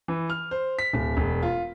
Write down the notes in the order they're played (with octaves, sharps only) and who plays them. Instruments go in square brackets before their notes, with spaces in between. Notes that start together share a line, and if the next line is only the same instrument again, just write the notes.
[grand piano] E3
F6
C5
B6
D1
E1
F4